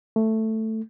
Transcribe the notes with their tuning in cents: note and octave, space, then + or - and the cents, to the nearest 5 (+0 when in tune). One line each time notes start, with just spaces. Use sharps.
A3 +5